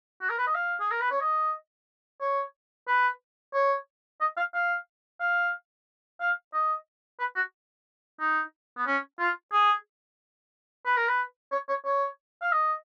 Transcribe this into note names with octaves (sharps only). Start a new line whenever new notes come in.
F#4
A#4
B4
D#5
F5
G#4
A#4
B4
C#5
D#5
C#5
B4
C#5
D#5
F5
F5
F5
F5
D#5
B4
F#4
D#4
B3
C#4
F4
G#4
B4
A#4
B4
C#5
C#5
C#5
F5
D#5